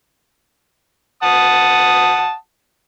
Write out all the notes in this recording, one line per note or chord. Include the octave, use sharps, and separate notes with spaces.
F#5 A5 D#6